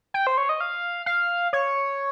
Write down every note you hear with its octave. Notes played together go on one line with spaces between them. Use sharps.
G5
C5
C#5
D#5
F5
F5
C#5